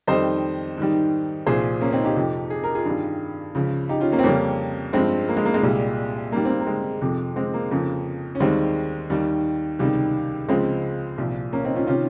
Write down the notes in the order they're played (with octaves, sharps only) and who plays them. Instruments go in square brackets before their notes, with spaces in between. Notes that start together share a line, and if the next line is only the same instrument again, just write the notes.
[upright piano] F2 D#3 G3 C5 D#5
G#2 D#3 G3
C2 A#2 F3 G#4 C5
A#3 C#4
C4 D#4
D#4 G4
F2 C3 F3
G#4
A#4
F4 G#4
G2 D#3 G3
C#2 C#3 F3
D#4 G4
C#4 F4
A#3 C#4
C4
F2 C#3 G3 A#3 C#4
G2 F3 G#3 C4
A#3
G#3
A#3
G#3
C2 A#2 G3
G#2 G3 A#3
C4
A#3
A#3
G#3
F2 C3 F3
G#3 C4
A#3
F2 C#3 F3
C#4
D#2 D#3 G3 G#3 C4
D#2 D#3 G3
C#2 C3 D#3 G3
C#2 C#3 F3 G#3 C4
C2 A#2 F3
A#3 C#4
C4 D#4
C#4 F4
C3 D#3 C#4 F4